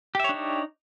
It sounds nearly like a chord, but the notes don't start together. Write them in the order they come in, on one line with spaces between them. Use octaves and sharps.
G4 E5 C#5 D4 D#4